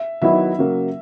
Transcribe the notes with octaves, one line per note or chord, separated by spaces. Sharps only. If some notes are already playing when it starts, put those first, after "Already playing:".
Already playing: E5
D#3 F#3 B3 E4 E5
C#3 F#3 A#3